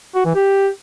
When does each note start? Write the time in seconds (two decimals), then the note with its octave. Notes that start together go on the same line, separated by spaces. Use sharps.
0.15 F#4
0.25 E3
0.35 G4